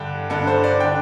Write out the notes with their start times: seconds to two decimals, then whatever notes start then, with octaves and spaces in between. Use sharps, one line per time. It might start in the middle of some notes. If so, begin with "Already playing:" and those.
Already playing: G2 D3 G5
0.30 G2 D3 A4
0.47 C5
0.64 D5
0.80 D3 G5